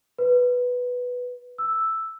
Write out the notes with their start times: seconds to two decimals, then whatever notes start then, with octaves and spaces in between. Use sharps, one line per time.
0.19 B4
1.58 E6